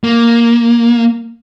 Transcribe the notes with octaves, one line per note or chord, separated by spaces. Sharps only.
A#3